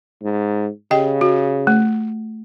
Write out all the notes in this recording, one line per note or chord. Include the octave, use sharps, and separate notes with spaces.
G#2
C#3 G4 D#5 G5
F#4
A3